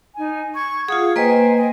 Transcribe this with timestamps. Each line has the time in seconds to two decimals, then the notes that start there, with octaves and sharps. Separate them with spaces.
0.16 D#4 G#5
0.54 C#6 G#6
0.89 F4 G#4 F5 F#5 D#6
1.16 A#3 B4 C5 D#5 G5 G#5
1.56 D#5 G#5